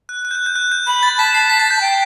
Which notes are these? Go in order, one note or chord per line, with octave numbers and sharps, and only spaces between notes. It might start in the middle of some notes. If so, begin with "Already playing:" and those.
F#6
F#6
G6
F#6
G6
F#6
G6
B5 G6
A6
A5 B6
C7
B6
A6
G6
A5
G5